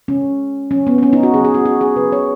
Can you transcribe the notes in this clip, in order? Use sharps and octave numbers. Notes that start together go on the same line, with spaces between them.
C#3 G#3 C#4
C#3 F#3 C#4
B3
B3
C#4
D#4
F#4
C#3 F#3 G#4
G#4
F#4
F#4
G#4
C#3 F#3 B4
C#5